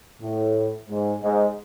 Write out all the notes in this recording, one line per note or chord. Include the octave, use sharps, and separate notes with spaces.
A2
G#2
G#2